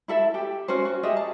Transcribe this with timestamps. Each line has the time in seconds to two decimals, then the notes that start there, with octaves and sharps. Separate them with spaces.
0.08 E4 A4 E5
0.34 G4 G5
0.68 C#4 F#4 C5
0.85 F#4
1.03 G4 G#4 D#5 E5
1.17 A5